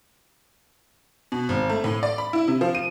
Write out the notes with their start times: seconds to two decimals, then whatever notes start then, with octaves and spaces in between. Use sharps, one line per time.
1.32 B2
1.49 G#1
1.70 A3
1.84 A2
2.03 D5
2.18 B5
2.33 E4
2.48 C3
2.61 F3
2.75 D#7